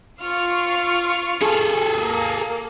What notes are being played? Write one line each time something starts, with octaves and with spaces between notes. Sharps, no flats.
F4 C#6 F6
G#4 A4
A#3